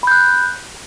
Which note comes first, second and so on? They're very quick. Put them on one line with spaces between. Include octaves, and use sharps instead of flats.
B5 G6 F#6